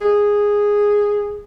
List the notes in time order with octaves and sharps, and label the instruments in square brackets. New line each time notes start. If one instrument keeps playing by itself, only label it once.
[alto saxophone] G#4